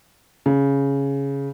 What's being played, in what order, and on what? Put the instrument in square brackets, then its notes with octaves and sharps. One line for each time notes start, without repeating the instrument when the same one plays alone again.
[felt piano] C#3